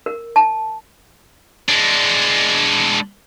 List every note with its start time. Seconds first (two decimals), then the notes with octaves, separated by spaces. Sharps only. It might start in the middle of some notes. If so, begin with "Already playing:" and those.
0.06 A#4
0.36 A5
1.69 G#3 D4